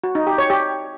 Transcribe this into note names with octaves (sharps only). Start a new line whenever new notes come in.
F#4
D#4
G4
C#5
G4